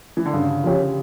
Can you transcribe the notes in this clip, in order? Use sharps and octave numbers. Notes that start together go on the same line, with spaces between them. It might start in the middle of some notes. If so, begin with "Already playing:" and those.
E3
D3
G2 C#3
F3 C#4 G4